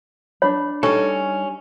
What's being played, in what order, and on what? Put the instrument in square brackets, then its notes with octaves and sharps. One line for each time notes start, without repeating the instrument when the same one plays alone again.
[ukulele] D4 B5 [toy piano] C#5
[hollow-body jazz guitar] G3 D#4 A4 [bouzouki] C#4